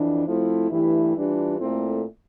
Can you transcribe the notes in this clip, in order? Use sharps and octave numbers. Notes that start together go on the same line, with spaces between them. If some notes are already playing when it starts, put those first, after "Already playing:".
Already playing: F2 E3 D4
F3 A3 C4 E4
G2 E3 A3 E4 G4
E3 G3 D4 F4
A#2 A3 C4 E4 A4